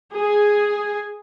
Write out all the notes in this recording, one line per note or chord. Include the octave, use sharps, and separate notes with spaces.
G#4